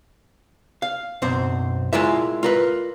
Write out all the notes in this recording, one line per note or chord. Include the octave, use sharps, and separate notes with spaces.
F5
B1 F#2 C4 C5
G#3 E4 F4 A#4 E5
F4 A#4 B4